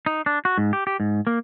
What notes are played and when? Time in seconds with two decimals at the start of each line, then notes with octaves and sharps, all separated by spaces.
0.06 D#4
0.26 D4
0.45 F#4
0.58 G#2
0.73 G4
0.87 G4
1.00 G#2
1.27 A#3